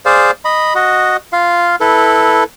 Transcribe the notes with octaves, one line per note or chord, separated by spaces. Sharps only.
G#4 C5 D5 F5
D#5 B5
F#4 D#5
F4 F5
E4 A4 B4